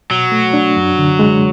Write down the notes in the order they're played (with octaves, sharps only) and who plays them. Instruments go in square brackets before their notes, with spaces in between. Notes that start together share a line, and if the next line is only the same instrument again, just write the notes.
[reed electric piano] B2 [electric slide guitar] F#3
[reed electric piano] A3
D4
F#2
D3
G#3